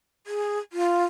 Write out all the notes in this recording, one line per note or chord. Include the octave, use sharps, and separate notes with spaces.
G#4
F4